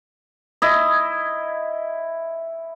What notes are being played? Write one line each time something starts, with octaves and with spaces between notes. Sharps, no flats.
E4 D#5